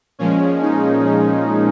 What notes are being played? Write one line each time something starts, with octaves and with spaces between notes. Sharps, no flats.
A#2 F3 G#3 C#4
D#4
C#4